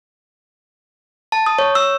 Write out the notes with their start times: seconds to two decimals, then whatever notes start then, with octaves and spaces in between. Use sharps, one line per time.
1.32 A5
1.46 D#6
1.59 C#5
1.75 E6